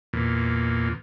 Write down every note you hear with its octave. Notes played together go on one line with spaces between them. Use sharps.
E2 A#2